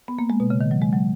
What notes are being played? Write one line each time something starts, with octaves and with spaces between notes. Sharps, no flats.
B3
A#3
G#3
B2
C#3
D#3
F#3
G#3
F#3